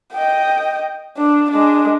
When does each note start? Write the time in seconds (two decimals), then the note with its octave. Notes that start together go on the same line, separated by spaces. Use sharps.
0.13 D#5 G5
1.17 D4
1.51 G#3 D4